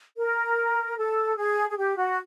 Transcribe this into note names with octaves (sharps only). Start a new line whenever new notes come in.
A#4
A4
G#4
G#4
G4
F#4